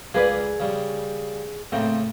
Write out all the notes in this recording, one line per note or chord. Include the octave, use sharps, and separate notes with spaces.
C#2 A#3 G#4 B4 D5
C#3 G3
A2 C#3 A#3 C4